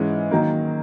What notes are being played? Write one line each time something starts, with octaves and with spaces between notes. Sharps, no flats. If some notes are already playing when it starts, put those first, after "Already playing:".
Already playing: G#2 E3 G#3 C#4
D#3 F#3 A#3